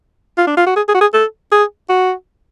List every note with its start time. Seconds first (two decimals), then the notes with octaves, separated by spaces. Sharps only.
0.38 F4
0.47 D4
0.57 F4
0.67 F#4
0.76 G#4
0.88 G#4
0.94 F#4
1.01 G#4
1.14 A4
1.52 G#4
1.89 F#4